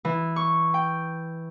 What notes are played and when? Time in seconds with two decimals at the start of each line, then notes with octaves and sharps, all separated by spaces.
0.05 E3
0.36 C#6
0.74 G5